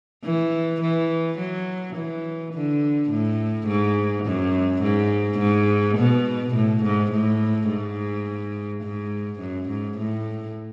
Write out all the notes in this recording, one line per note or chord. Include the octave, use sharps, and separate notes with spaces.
E3
E3
F#3
E3
D3
A2
G#2
F#2
G#2
G#2
B2
A2
G#2
A2
G#2
G#2
F#2
G#2
A2